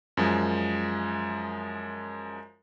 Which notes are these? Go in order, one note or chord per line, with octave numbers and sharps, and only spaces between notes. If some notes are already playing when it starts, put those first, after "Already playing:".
F#2 F3 G#3